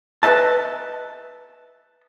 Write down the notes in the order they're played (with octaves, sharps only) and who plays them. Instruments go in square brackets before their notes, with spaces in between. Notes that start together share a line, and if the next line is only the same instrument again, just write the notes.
[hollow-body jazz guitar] B4 C5 D#5 E5 A5